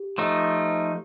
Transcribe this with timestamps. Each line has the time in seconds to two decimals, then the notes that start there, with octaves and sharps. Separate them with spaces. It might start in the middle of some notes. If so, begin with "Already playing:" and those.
Already playing: G4
0.18 F3 A3 D#4